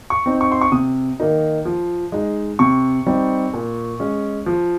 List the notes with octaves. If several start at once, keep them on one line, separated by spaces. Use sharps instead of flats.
C#6
C4 D#4
C#6
C6
C#6
C3 D#6
D#3 A#3 D#4
F3
G#3 D#4
C3 C#6
G3 C4 D#4
A#2
G#3 C#4
F3